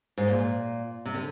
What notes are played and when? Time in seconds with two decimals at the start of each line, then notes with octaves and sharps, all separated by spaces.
0.17 G#2
0.28 A#2
1.05 C3
1.14 D3